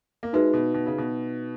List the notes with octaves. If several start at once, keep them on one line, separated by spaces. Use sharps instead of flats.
A#3
G#3 D#4 F#4 B4 E5
B2
B2
C#3
B2